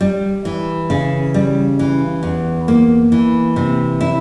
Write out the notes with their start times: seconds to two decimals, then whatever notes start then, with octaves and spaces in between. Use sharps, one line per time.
0.01 G3
0.45 E3
0.90 C#3
1.34 G3
1.79 E3
2.23 E2
2.68 A#3
3.12 E3
3.56 C3
4.01 E4